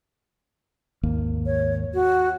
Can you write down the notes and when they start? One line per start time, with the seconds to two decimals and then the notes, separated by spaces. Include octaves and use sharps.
1.03 G#1 D#2 A#3
1.46 C#5
1.94 F#4